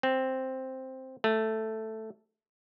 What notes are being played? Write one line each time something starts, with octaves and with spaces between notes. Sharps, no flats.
C4
A3